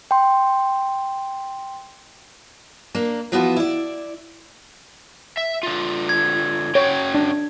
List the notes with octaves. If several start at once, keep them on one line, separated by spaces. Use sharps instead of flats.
G5 C6
A#3 D4
E3 F3 B3 F4 F#4
E4 D5
E5
D3 F4
G#6
C#4 F#4 C#5 G5
D4